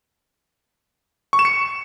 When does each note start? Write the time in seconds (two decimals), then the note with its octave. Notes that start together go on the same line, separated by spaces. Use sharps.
1.33 C#6
1.39 E7
1.45 C#7